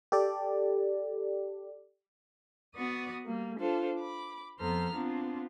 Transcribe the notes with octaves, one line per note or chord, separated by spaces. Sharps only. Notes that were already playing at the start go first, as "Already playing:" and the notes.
G4 A4 D5
B3 F#4 D5 C#6 D#6
G3 A#3
D4 F4 A4 C5
B5 D6
F2 B3 A4 C5 A#5 F6
B3 C4 D4 F4